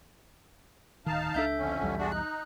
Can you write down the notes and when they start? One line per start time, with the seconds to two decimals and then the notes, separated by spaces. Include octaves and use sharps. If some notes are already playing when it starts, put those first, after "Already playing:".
1.06 D1 D#3 D#4 F5 A5
1.34 C#2 A#3 D4 A4 E5 G6
1.58 F2 D3 C#4
1.81 B1 E2 G3
1.98 G#3 D4 F#4
2.12 D#4 F#6